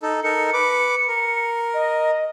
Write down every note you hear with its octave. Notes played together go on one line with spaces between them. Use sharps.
D#4 A4
D#4 A4 A#4 C#7
B4 D6
A#4
D#5